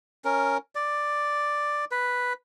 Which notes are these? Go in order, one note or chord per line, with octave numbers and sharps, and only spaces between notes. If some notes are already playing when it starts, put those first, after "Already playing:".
C#4 A#4
D5
B4